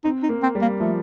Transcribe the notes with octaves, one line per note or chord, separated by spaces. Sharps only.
C4 D#4
D#4
A#3
C4
G3
A#3
F3 A3